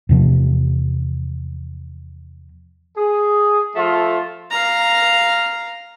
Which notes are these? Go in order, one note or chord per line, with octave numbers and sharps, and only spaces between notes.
E2 C3 F3
G#4
F3 A3 F4 A4
F5 A#5